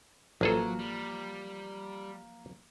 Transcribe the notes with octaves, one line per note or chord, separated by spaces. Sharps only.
A1 F3 F#3 A#3 G#4 A4
G3